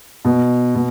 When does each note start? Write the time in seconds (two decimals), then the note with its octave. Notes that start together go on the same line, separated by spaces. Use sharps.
0.25 B2
0.75 B2